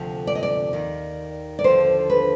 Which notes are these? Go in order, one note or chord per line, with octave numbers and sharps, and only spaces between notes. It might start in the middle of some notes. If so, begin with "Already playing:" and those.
Already playing: D2 C3 F3
D5
D#5
D5
D#2 D#3
D5
D#2 D3 F3 C5
B4